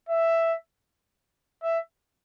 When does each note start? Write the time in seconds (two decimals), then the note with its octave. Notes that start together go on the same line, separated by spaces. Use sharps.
0.09 E5
1.63 E5